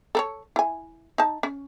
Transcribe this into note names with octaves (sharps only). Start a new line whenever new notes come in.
A4 A#4 C#5
E4 G#5
D#4 A5
C#4